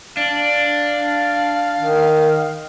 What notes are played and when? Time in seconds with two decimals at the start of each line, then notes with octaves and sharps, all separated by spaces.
0.17 D4 F5
1.79 D#3